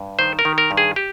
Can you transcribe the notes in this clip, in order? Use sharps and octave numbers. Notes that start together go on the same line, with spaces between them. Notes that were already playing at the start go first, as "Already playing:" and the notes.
Already playing: G2
D#3 C5
A#4
D#3
A#4
G2
G#4
G4